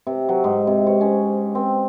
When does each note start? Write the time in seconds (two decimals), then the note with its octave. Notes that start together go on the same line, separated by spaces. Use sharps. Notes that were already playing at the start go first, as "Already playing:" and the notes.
0.07 C3
0.29 F#3
0.44 G#2
0.67 C3
0.87 C#5
1.01 C#4
1.55 C4